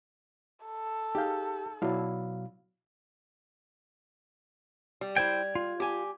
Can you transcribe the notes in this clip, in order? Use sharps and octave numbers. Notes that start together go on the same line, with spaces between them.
A4
D#4 G4 G#4 F5 G6
B2 F#3 E4 D5 F5
G3
E4 C5 G5 G#6
F4
G4 G#5